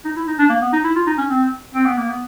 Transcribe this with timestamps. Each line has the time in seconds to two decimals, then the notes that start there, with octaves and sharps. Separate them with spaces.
0.05 D#4
0.16 E4
0.27 D#4
0.39 D4
0.50 A#3
0.62 B3
0.73 D#4
0.84 E4
0.96 F4
1.07 D#4
1.18 C#4
1.30 C4
1.75 C4
1.86 B3
1.97 A#3
2.09 B3